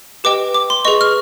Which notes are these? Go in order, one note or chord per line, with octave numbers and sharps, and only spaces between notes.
G4 B4 D#5 G5 D6
D6
C6
G#4 B4 D#5 C#6
F6